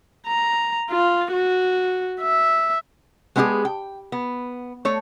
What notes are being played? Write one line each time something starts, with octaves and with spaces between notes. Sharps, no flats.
A#5
F4
F#4
E5
G#3 B3 C#4 E4 G4 G#4
G5
B3
A3 C#5